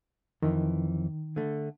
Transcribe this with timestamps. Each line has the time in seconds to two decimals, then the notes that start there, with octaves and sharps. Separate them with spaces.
0.42 F2 D#3 E3
1.36 D3 A3